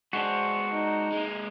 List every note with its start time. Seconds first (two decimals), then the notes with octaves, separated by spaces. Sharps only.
0.13 G#3 D4 F#4 C5
0.72 D#4
1.12 G#3 A#3